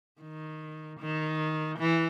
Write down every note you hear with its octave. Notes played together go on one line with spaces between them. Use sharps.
D#3
D#3
E3